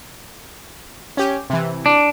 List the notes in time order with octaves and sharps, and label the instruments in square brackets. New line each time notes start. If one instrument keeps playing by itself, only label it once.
[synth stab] C#4 G4
C3 E3
[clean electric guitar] D4